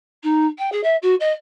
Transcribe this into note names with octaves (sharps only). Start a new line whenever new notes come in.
D#4
G5
G#4
E5
F#4
D#5